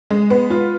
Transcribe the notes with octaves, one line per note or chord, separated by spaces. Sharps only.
G#3
B3
F4